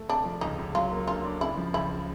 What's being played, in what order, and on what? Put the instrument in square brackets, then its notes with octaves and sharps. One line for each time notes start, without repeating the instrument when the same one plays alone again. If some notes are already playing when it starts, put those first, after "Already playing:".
Already playing: [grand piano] A3
[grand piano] C3 [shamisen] D4
[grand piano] F3
[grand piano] C#2 [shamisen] D#4
[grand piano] C#2
[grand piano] F#3 [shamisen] F4
[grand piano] A#3
[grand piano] D3 [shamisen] F4
[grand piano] D4
[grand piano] C#3 [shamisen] E4
[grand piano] F3
[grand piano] C#2 [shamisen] E4